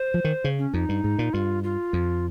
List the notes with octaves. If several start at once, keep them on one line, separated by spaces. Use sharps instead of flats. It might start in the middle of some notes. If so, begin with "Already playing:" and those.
Already playing: C5
F3
D#3
C#3
C#4
F2 D#4
G2
G#2
A#2
G2 F4
F4
F2